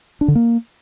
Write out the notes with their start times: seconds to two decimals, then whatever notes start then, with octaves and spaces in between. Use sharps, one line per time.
0.21 D4
0.28 D3
0.35 A#3